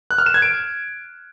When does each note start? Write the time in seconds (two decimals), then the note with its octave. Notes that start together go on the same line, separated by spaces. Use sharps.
0.11 F#6
0.18 F6
0.26 E7
0.34 G#6
0.42 D7